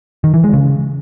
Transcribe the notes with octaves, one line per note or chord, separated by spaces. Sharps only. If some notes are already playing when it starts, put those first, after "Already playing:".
D#3
E3
G#3
C#3